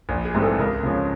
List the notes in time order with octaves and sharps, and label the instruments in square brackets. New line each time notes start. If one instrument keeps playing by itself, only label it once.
[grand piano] A#1
G#4
G#2 E3 G3 C4
A4
C#2 A#4
C#3 F3 G#3 C#4